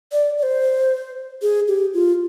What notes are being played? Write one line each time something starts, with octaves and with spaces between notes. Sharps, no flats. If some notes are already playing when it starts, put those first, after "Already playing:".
D5
D5
C5
G#4
G4
F4